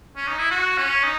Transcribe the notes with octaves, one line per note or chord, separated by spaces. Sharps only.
C#4
D#4
E4
F#4
C#4
D#4